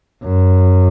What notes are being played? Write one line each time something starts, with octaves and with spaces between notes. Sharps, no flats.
F#2